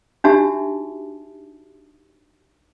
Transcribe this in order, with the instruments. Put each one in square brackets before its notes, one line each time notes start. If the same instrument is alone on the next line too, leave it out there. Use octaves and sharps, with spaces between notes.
[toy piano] D4 D#4 F#4 G4 E5 A5